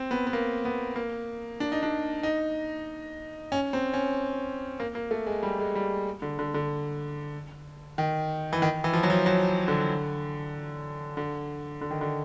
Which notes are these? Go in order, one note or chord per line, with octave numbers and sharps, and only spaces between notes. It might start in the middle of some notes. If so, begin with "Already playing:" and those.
Already playing: C4
B3
B3
A#3
B3
A#3
D4
D#4
D4
D#4
C#4
C4
C#4
A#3
A#3
A3
G#3
G3
G#3
G3
D3
D3
D3
D#3
E3
D#3
E3
F3
F#3
F3
F#3
D3
D3
D3
D#3
D3